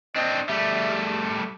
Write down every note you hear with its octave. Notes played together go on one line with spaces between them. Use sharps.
C4 D4 D#5
G3 A3 E5